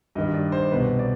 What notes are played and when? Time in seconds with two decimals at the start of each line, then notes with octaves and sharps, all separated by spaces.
0.15 G2 D#3 D#5
0.34 D5
0.52 C5
0.71 C2 B2 B4
0.99 D5